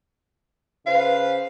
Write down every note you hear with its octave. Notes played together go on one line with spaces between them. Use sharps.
C#3 B4 C5 F5